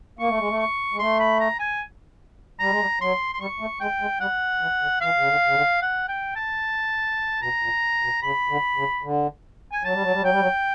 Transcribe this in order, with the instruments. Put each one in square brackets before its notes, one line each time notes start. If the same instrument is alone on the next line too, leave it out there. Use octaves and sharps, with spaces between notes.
[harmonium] A#3 [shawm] C#6
[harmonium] A3
G#3
A3
[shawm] C#6
[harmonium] G#3
[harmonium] A3 [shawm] C6
[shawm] B5
A#5
G#5
[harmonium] G3 [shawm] A#5
[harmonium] G#3
G3
[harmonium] F#3 [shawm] C6
[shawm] C6
[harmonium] G3 [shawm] C#6
[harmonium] A3
[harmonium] G#3 [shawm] G5
[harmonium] G#3
[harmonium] G3 [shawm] F#5
[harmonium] E3
D3
[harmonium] E3 [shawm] F5
[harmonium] C#3
D3
C#3
D3
[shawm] F#5
G5
A5
[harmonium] B2 [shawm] A#5
[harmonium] A#2
B2
[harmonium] C#3 [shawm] B5
[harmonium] D3
C#3
D3
[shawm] G#5
[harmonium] F#3 [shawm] A5
[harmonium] G3
F#3
G3
[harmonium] F#3 [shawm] G5
[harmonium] G3
F#3